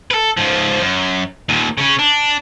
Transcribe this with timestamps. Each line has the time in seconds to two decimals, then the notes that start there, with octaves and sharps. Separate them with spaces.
0.11 A4 B4
0.37 G#2 F3
0.81 F#2
1.49 D#2 A#2
1.78 C#3 C#4
1.99 D4